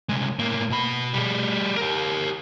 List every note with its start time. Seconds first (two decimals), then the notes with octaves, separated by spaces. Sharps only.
0.09 C2 G#3
0.39 A2 A#3
0.70 B2 B5
1.13 G3 G#4
1.77 G4 A#4